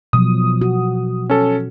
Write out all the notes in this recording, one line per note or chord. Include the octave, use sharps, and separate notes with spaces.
B2 F3 F#3 D#6
F#4
C#4 A4